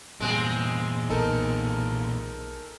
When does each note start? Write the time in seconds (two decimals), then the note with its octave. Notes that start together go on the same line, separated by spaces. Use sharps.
0.20 E2 G2 A#2 G#3 C4 G#4
1.10 B1 B2 D#4 A4 A#4